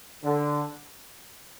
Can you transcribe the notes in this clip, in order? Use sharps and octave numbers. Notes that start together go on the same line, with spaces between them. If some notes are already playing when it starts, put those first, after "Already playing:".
D3